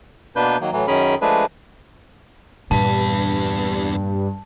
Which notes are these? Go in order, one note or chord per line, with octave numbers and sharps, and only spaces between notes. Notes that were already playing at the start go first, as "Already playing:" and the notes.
B2 A#3 D4 B4 G6
D#3 F#3 A#3
A2 E3 F#3
F#2 D#3 C#4 G#4 A#4 B5
F3 G#3 A3 D4 G#4 B4
E2 G2 A#2 B4 A5